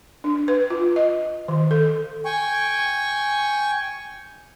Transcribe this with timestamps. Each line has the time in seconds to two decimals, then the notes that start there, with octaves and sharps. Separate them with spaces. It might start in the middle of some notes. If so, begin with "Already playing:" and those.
0.24 D4
0.48 B4
0.70 F4
0.96 D#5
1.48 D#3
1.71 A4
2.25 G5 G#5 C#6